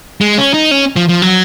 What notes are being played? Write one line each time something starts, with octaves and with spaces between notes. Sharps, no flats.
G#3
C#4
D#4
C#4
F3
F3
F#3